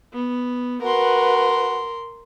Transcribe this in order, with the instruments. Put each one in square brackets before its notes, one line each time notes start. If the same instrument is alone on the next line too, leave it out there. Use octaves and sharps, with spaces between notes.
[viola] B3
[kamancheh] F#4 B4 [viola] A#4 C6